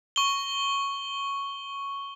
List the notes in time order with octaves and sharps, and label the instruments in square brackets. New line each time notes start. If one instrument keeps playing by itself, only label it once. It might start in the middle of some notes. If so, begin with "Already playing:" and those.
[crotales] C#6 G7